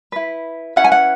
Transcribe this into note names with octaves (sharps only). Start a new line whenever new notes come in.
E4 B4
C#4 E4 B4 F#5
G#5
F#5